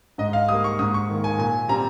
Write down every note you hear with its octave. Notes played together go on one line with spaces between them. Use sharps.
G#2 D#5
F5
G3 A#3 D#6
C#6
G#2 D#6
C#6
D#3 A#3
G#5
A#2 G#5
G3 C4 A#5